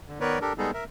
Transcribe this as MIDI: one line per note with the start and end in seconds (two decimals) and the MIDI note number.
0.08 0.19 50
0.21 0.39 51
0.21 0.39 59
0.21 0.39 70
0.21 0.39 71
0.21 0.39 73
0.21 0.39 74
0.41 0.53 62
0.41 0.53 67
0.41 0.53 69
0.41 0.53 70
0.58 0.71 55
0.58 0.71 56
0.58 0.71 59
0.58 0.71 63
0.58 0.71 68
0.58 0.71 69
0.74 0.84 70
0.74 0.84 76